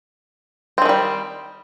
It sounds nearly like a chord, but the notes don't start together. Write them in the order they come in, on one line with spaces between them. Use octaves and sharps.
C4 D#3 A3 G3